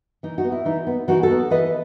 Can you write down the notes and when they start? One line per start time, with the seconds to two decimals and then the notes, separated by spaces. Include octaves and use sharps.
0.23 E3 D#4
0.38 D#4 F#4
0.44 B3
0.52 E4
0.65 E3 D#4
0.87 B3
1.08 E3 D#4 F#4
1.23 F#4 A4
1.30 B3
1.50 E3 B4 D#5